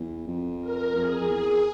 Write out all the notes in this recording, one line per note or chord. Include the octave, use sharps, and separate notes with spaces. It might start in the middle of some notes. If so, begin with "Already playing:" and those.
Already playing: E2
F2
A#4
F2 G#4
F2
E2 G#4